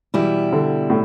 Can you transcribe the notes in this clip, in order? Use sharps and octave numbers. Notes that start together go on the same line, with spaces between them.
B2 E3 G3 E4
D3
A2